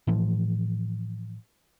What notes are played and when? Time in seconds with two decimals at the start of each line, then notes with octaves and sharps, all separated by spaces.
0.07 A2 E3 F3